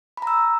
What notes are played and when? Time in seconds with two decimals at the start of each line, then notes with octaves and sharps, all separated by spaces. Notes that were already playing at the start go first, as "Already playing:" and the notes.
0.17 B5
0.22 A#5
0.27 E6